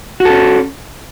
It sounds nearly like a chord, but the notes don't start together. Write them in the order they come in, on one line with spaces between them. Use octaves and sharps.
F#4 A4 C#4